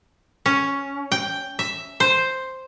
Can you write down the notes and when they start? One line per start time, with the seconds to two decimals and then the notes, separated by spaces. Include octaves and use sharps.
0.46 C#4
1.12 G5
1.59 E5
2.00 C5